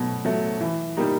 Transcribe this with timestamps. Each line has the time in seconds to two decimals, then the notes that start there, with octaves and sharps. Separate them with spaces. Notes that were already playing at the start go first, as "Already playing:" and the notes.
Already playing: B2 F#3 A3
0.25 F#3 A3
0.61 E3
0.97 G3 A#3 D#4 G4